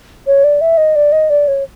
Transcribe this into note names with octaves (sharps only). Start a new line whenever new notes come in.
C#5
D5
E5
D#5
D5
D#5
D5
C#5